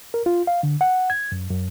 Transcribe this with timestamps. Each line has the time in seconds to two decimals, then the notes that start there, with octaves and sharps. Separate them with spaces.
0.14 A#4
0.26 F4
0.47 F5
0.63 D3
0.81 F#5
1.10 G#6
1.32 F#2
1.51 F#2